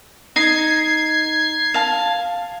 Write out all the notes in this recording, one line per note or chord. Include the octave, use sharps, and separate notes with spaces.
D#4 G#6 C7
F5 A5